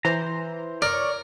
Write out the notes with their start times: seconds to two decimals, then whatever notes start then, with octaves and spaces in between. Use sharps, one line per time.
0.05 E3 C5 A#5
0.82 A#4 C#5 D5